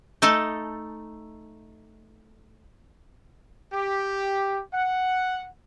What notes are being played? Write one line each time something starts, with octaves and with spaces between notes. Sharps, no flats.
A3 D#4 A4 A5
G4
F#5